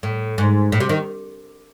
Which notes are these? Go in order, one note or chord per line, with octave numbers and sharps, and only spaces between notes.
A2
G#2
A2
C3
D#3